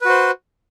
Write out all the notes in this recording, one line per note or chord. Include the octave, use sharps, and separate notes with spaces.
F#4 B4 C5